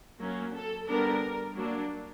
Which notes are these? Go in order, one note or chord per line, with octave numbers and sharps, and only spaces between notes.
F#3 A#3 C#4
A4
D3 G3 B3 D4 A#4
F#3 A#3 D4